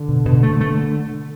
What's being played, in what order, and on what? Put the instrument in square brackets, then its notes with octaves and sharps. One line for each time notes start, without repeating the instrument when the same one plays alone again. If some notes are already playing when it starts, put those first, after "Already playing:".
Already playing: [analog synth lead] D3
[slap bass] B2
B2
A3
A3